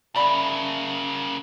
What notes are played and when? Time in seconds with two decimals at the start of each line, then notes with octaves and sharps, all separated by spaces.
0.15 C#3 A#3 D5 E5 B5